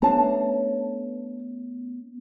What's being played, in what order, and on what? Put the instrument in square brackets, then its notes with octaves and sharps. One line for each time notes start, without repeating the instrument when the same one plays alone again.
[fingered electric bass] A3 B3 C#4 [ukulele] D4 A5 A#5